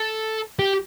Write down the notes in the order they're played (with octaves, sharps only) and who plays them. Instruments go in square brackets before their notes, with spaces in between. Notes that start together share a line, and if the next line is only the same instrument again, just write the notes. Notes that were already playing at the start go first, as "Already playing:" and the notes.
Already playing: [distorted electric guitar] A4
G4